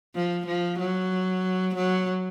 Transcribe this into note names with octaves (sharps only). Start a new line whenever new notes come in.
F3
F3
F#3
F#3